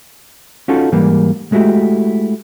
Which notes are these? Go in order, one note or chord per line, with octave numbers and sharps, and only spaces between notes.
C#4 D#4 F4 F#4 A4
G#2 E3 G3 A#3
G#3 A3 E4 F#4 G4